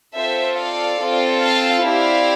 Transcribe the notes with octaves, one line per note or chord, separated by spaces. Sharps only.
C4 F4 A4 C5 E5
D5 F5
C4 F4 A4
F5 A5
C4 E4 G4 D5 F5